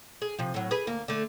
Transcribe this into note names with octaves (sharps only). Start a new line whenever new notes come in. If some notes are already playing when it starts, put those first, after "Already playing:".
G#4
C3 F3
A2 F#3
G#4 B4
D2 A#3
D3 A3